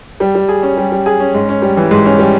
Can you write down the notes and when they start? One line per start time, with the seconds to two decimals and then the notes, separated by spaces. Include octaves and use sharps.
0.20 G3
0.35 G3
0.49 G#4
0.63 C#4
0.77 G3
0.92 G3
1.06 G#4
1.20 C#4
1.34 G#2
1.49 C#4
1.62 G3
1.77 E3
1.91 G#2
2.06 C#4
2.19 G3